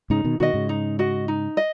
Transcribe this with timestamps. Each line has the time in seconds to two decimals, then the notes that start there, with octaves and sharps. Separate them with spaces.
0.10 G#2 C#3 D#4
0.24 B2 D#3
0.40 B2 D#3 F#4 D#5
0.54 G#2 C#3
0.69 D#4
0.99 F#4 D#5
1.28 D#4
1.57 D#5